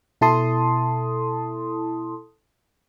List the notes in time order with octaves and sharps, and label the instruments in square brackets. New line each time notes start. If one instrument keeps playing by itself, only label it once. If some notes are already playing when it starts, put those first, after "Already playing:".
[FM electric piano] B2 E4 A4 A5 C6 D#6